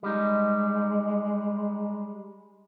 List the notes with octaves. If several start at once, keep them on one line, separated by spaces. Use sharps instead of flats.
G3 G#3 D#4